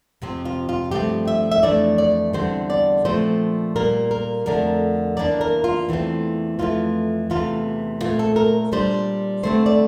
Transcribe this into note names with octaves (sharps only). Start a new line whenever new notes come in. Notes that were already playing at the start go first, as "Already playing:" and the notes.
F2 C3 F3 C4
F4
F4
G2 F3 A3 C4 G4
E5
E5
F2 E3 A3 D4 D5
D5
E2 D3 G3 C4 C5
D5
A#2 F3 A3 C4 C5
A#2 G3 A#3 A#4
A#4
F2 D3 A3 D4 A#4
E2 E3 A#3 D4 D5
A#4
F4
E2 E3 A3 C4
F2 E3 A3 F4
E2 C3 E3 A3 F4
A#2 A3 C4 F4
A4
A#4
A#2 G3 D4 C5
D3 A3 C4 C5
D5